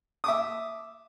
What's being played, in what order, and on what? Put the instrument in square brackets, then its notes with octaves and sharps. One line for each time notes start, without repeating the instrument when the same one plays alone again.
[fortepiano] E5 D6 D#6